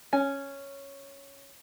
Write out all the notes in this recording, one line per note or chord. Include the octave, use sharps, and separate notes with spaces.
C#4 G#5